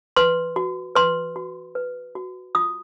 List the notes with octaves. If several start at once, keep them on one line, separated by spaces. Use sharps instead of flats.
B4 C6
F#4
B4 C6
F#4
B4
F#4
F4 D#6